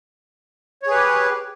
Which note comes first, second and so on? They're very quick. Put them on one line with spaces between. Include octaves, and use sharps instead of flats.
C#5 G#4 B4 G4